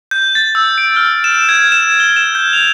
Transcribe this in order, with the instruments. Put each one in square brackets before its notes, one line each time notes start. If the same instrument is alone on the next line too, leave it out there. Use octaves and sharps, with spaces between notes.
[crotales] G6
A6
E6
D7
F6
E7
G#6
E7
G7
E7
G6
F7